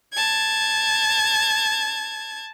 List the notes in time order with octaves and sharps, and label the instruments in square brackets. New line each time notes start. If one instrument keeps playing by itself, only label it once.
[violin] A5 G#6